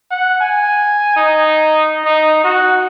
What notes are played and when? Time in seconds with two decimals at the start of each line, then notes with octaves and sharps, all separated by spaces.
0.11 F#5
0.41 G#5
1.16 D#4
2.05 D#4
2.44 F#4